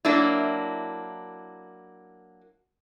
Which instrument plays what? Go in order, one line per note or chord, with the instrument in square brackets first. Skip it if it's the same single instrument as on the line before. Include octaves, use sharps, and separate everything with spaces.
[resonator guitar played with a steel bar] F#3 A#3 D4 E4